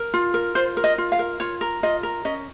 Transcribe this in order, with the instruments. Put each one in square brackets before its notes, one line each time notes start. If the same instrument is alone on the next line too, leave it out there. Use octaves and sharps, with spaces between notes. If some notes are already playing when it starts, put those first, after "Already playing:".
Already playing: [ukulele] A#4
F4
A#4
F4 C5
A#4
D#5
F4
F5
A#4
F4 C#5
A#4
F4 D#5
A#4
C#4 D#5